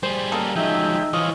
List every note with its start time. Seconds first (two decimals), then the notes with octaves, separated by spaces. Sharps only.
0.03 G3 G#4 C5
0.32 C#3 A#3 A4
0.56 F3 F#3 G#3 D#4 E5 G5
1.13 E3 F3 F4 C#5 D#5